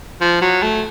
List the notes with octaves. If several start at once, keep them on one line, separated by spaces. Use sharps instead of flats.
F3
F#3
A3